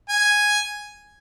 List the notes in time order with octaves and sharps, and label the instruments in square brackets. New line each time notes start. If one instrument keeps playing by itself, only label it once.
[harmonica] G#5